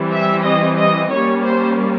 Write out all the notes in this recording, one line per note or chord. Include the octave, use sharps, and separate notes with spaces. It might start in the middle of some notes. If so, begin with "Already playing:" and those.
Already playing: E3 G3 C4
E5
D#5
D#5
G3 A#3 C#4 C#5
C5